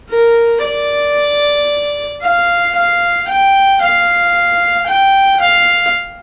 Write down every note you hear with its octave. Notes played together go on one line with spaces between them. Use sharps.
A#4
D5
F5
F5
G5
F5
G5
F5